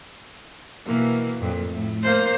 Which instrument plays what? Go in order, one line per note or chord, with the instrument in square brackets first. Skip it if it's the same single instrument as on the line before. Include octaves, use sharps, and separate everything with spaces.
[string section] B2 E3 A#3
F2 A#2
A2
[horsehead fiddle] A#3 C5